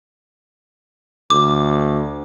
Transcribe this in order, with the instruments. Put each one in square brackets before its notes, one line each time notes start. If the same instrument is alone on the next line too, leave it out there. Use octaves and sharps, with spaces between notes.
[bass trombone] D2 [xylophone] D6